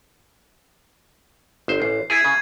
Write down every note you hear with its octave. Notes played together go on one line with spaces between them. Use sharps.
G1 C5
A1 C7
E4 G#4 G#6 A6 D#7
C#3